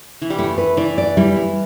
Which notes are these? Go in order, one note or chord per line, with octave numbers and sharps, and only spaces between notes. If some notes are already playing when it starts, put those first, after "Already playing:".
E3
G3
A3 E4
B4
E3 D5
D5
E3 G3
E4